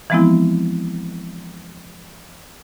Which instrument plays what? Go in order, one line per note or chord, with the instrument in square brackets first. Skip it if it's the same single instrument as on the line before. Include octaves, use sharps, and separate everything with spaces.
[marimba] E3 F3 G#3 B3 C4 E4